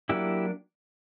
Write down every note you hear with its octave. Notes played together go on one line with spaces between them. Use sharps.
F#3 A#3 D4 E4 G4